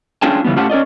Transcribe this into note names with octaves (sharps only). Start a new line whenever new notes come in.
C#4 D4 F4 G#4 G5 A5
C#3 E3 G3 B3
A2 C#4 F4 G4 F#5 A5
C#4 A#4 D5 D#5